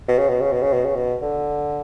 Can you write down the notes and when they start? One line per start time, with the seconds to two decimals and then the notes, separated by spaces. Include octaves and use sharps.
0.08 B2
0.18 C#3
0.29 B2
0.41 C#3
0.52 B2
0.62 C#3
0.73 B2
0.85 C#3
0.95 B2
1.22 D3